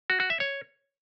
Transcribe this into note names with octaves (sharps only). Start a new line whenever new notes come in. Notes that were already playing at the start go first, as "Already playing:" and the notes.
F#4
F#4
E5
C#5